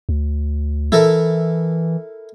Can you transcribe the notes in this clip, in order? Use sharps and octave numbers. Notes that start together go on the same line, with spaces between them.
D2
E3 E4 A4 A#4